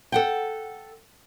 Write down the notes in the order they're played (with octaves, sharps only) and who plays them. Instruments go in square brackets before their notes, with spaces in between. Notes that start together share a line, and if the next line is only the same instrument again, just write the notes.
[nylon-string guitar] A4 F#5 G5